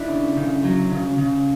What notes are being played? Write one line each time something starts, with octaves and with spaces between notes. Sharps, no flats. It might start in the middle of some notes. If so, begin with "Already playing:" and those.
Already playing: D4 E4
C#3
C#3
F#3
C#3
C#3